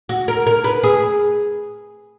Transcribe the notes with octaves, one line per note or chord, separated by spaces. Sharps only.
F#4
A#4
A#4
B4
G#4